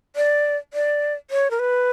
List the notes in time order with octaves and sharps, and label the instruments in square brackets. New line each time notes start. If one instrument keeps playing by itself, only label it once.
[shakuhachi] D5
D5
C#5
A#4
B4